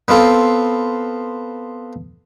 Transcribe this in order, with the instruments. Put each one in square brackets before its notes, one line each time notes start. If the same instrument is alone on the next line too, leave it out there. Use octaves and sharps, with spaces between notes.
[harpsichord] B3 C4 F4 A4